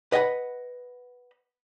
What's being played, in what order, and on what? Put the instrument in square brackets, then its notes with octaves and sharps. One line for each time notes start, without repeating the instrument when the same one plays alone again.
[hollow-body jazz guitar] B4 D#5 F#5 G#5 B5